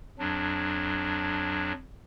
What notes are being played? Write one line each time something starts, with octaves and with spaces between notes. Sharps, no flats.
F2 F#3 D4